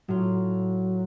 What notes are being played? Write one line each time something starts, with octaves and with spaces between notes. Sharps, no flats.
A2 F#3 F4